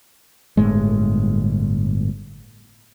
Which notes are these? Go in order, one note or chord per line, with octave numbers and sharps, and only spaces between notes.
G1 A2 G#3